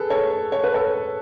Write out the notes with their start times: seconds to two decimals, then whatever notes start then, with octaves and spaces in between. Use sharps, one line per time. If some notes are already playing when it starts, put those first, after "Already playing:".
Already playing: G#4 A4 B4
0.10 A4 C#5
0.52 C#5
0.64 B4
0.74 A4 C#5